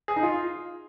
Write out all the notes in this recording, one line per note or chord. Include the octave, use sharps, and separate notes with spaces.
G#4
D#4
F4